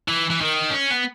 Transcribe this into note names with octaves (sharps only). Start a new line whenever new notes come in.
E3
E3
D#3
C#4
B3